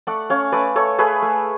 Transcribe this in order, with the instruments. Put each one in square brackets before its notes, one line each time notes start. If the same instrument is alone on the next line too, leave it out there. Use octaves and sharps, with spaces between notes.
[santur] A3 D5 F#5
C#4 C#5 F5
A3 B4 D5
A3 A4 C#5
A3 G#4 B4
A3